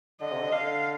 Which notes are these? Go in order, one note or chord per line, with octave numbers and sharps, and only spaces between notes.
D3 D#5
C3
D3
D3 F5